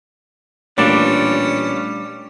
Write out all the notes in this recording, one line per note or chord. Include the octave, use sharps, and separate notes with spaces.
A1 A#2 G3 C#4 D4 D5